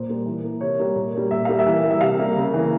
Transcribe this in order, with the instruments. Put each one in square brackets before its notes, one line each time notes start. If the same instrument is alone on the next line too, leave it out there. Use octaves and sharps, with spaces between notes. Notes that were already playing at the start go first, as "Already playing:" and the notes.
Already playing: [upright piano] A#2 C5
G3 A#3
E3
A#3
C3 C#5
G3 A#3
A#2
G3 A#3
A#2 E5
G3 A#3 F5
E5
E3
G3 A#3
E5
C3 F5
G3 A#3
C#3
E3 A#3